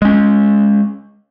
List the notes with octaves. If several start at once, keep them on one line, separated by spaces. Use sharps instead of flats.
G#3 C#4